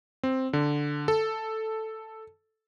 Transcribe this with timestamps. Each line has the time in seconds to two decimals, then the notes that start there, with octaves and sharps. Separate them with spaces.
0.23 C4
0.53 D3
1.08 A4